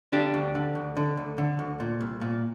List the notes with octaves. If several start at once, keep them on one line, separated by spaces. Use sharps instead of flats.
D3 D4 G4
D2
D3
D2
D3
D2
D3
D2
A#2
C2
A#2